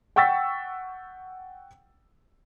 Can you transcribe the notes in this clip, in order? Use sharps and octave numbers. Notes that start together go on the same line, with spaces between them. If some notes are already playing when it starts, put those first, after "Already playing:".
F#5 G5 C#6 E6 A6 B6